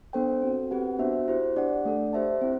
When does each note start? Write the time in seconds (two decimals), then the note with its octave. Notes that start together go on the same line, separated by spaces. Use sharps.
0.13 B3 D4 A4 C5 G5
0.42 C4 F#4 A4
0.71 C4 G4 B4 F#5
0.99 B3 D4 F#4 C5 E5
1.28 E4 G4 C5
1.56 D4 G4 D5 F#5
1.85 A3 D4 A4 D5
2.13 G4 C5 E5 A5
2.41 C4 E4